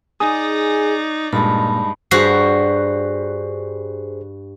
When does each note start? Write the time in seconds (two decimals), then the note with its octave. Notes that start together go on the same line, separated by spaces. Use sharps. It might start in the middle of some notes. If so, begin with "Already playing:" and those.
0.20 D#4 G#4 D5 D#6
1.33 G2 A#2 G#3 D#4 A5 B5
2.11 G2 G3 F#4 G#4 C5 C7